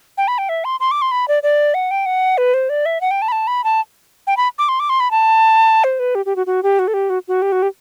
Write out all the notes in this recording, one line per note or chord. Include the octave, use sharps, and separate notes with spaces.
G5
B5
G5
E5
C6
C6
D6
C6
B5
D5
D5
F#5
G5
F#5
B4
C5
D5
E5
F#5
G5
A5
B5
A5
B5
A5
G5
B5
D6
C6
D6
C6
B5
A5
C5
B4
G4
G4
F#4
F#4
G4
F#4
A4
G4
F#4
F#4
G4
F#4
G4